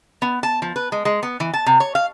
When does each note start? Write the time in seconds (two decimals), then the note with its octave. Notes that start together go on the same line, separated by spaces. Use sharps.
0.22 B3
0.43 A5
0.62 F3
0.76 B4
0.92 G#3
1.05 G#3
1.23 B3
1.40 E3
1.54 A5
1.66 C3
1.80 C#5
1.95 F5